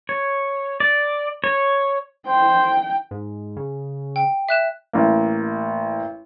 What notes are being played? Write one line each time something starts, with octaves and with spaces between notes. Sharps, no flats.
C#5
D5
C#5
C5 G5
G#2
C#3
G5
E5 F#6 E7
A1 A#3